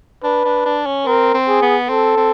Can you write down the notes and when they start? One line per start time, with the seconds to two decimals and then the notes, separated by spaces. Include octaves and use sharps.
0.24 D4 B4
0.45 D4
0.65 D4
0.86 C#4
1.06 C4 A#4
1.34 C4
1.48 G#4
1.62 B3
1.89 C4 A4
2.17 C4